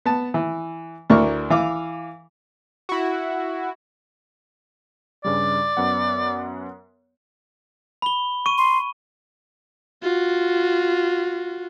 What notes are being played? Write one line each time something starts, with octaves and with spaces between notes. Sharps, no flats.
B3 A5
E3
D2 D4 E4 A#4 C#6
E3 F5 D6
E4 F#4
G2 C#3 G3 D5
F#2 B3 F#5
B5 G7
C#6 D#7
C6
F4 F#4